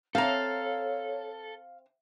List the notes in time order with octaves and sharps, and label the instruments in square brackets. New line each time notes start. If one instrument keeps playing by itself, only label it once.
[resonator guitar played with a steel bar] C4 A#5 [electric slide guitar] A4 [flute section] C#5 [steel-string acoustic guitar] F5